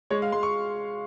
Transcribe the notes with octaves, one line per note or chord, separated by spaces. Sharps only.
G#3 C#5
F5
G#3 C6
C#6